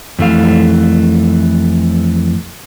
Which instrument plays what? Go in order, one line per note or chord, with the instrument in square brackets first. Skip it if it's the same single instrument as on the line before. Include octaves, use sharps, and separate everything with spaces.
[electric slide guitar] F2 E3 A3 F5